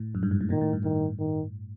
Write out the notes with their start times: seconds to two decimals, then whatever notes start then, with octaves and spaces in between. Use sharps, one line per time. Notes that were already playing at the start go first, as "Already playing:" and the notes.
Already playing: A2
0.15 F#2
0.23 G2
0.31 G#2
0.41 A2
0.50 A#2 D#3
0.61 A2
0.73 G2
0.84 G2 D#3
1.19 D#3